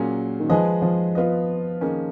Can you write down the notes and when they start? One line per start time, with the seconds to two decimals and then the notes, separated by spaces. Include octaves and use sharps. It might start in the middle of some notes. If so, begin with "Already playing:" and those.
Already playing: A#2 F#3 A#3 C#4 G#4
0.40 D#3
0.49 F3 G#3 D#4 G#4 B4 D#5
0.82 F3
1.15 B3 F4 B4 D#5
1.81 D#3 A#3 C#4 G#4